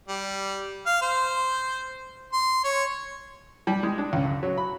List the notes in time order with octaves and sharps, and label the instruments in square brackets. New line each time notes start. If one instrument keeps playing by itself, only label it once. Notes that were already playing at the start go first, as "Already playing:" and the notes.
[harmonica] G3
F5
C5
C6
C#5
[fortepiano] G3
G#3
D4
C#2
F#2
F#3
B5